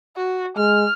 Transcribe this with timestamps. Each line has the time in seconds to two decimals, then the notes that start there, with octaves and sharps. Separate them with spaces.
0.16 F#4
0.57 G#3 F6